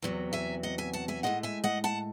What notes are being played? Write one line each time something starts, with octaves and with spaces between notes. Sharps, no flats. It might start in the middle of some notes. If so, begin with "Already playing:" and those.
E2 C3 F#3
E5 G#5
D#5 F#5
E5 G#5
F#5 A5
E5 G#5
A2 G#3 C4 D#5 F#5
E5 G#5
D#5 F#5
F#5 A5